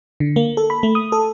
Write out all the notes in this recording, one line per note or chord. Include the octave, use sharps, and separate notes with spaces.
D3
A#3
A4
B5
A3
D#6
A4